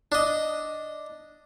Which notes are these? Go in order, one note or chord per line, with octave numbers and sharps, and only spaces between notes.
D4 D#5